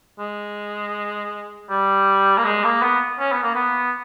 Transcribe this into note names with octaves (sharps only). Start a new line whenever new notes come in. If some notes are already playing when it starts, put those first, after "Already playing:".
G#3
G3
A#3
G#3
A#3
B3
C#4
B3
A#3
B3